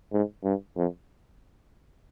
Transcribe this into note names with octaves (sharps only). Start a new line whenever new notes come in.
G#2
G2
F2